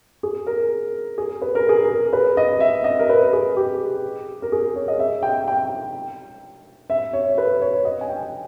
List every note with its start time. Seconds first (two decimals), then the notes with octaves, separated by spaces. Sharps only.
0.23 G#4
0.47 A#4
1.18 G#4
1.42 B4
1.55 A#4
1.69 G#4
1.84 A#4
2.13 B4
2.37 D#5
2.60 E5
2.84 D#5
2.99 A#4
3.09 B4
3.33 G#4
3.56 G4
4.42 A#4
4.52 G#4
4.76 C#5
4.88 D#5
4.99 E5
5.23 G5
5.48 G5
6.90 E5
7.13 C#5
7.38 B4
7.62 C#5
7.85 D#5
8.01 G#5
8.09 G5